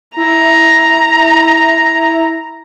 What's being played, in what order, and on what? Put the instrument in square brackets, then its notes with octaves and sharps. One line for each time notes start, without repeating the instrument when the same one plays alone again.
[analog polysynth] E4 [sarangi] A#5